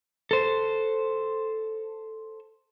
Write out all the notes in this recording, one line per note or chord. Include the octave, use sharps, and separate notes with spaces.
A4 C5